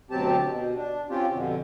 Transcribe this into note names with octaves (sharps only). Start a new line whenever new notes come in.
D2 B2 F#3 C4 G4 A5
B2
D4
C4 C#4 F4 G4
F2 B2 D3